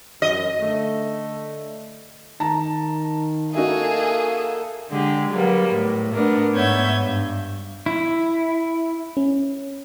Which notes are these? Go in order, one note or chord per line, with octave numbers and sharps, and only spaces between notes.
F#2 D#5
D3 A3
D#3 A5 A#5
A#3 D#4 F#4 G#4 A4 E5
D3 G#3 G4
F#3 G3 A#3 B3
A2
A3 B3 D4 A#4
G#2 B3 C#5 E5 G6 G#6
G2
E4
C#4